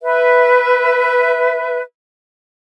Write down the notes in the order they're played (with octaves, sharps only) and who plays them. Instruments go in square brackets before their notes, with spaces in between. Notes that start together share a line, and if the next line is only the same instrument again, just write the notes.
[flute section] B4 E5